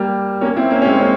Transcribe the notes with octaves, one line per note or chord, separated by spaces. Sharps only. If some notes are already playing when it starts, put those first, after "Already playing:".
Already playing: G3 A#3
A#3 C#4
C4 E4
A#3 C#4
C#4
G#3 C4
A#3 C#4